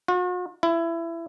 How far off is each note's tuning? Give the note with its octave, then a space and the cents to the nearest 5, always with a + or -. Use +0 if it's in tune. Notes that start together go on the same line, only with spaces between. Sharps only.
F#4 -45
E4 +20